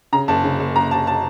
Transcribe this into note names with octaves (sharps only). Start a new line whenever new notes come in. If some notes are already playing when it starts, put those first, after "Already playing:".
C#3 A#5
F#1 A5
C#3
F#1
F#1 A#5
F#1 A5
A5